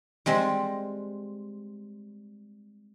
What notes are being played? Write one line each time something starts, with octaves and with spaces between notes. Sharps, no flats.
G3 G#3 C4